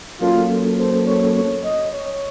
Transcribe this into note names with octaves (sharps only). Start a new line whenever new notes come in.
F#3 A#3 C#4 F4 A4
C5
C#5
C#5
D#5
C#5